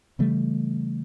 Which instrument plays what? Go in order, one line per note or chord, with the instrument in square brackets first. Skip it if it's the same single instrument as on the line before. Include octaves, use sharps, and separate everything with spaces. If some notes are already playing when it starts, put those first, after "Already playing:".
[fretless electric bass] C#3 E3 G3 A3